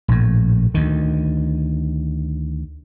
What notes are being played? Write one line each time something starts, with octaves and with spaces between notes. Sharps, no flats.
A#1 A2
D2 D#3